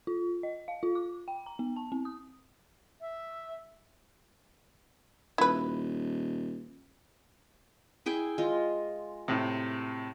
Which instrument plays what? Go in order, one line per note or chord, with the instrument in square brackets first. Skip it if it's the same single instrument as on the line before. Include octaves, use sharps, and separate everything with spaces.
[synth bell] F4
D#5
F5
F4
D6
G5
A#5
B3
A5
C4
D#6
[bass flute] E5
[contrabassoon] D#1 [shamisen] E4 B4
[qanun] E4 G#4 G5
G#3 F4
[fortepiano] A2 C3